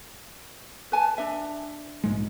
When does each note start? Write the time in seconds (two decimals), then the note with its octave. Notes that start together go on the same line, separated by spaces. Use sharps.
0.92 B4 G#5 A5
1.18 D4 E5
2.04 A#1 G#2 G#3